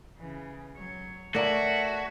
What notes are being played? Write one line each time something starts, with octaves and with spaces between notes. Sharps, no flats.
C#3 E3
F#3 C#5
A3 F#4 A#4 C#5 D5 E5 A5